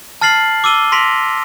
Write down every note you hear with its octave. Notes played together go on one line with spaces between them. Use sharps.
A5 F6 A6 C7 F#7
D6 E6 D#7 G7
C6 A#6 B6 D7 F7